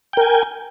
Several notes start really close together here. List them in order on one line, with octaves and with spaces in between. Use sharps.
G5 A#4 G#5